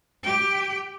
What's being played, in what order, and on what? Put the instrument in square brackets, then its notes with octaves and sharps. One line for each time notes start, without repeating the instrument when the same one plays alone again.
[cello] G4 G5